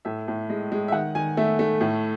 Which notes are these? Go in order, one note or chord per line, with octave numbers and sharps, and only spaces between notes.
A2 E5
A2
G#3
G#3
E5
D#3 F#5
D#3 G#5
A3 E5
A3
A2